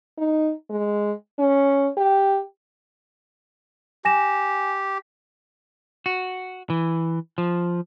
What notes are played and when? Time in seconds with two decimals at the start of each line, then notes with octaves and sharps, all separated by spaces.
0.18 D#4
0.70 G#3
1.39 C#4
1.97 G4
4.05 G4 G#5 A#6 E7
6.06 F#4
6.70 E3
7.38 F3